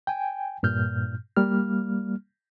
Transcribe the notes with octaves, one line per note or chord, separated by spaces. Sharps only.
G5 G#5
G2 A#2 F6 G6
G3 A#3 F6